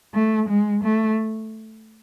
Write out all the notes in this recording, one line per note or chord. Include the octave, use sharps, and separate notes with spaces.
A3
G#3
A3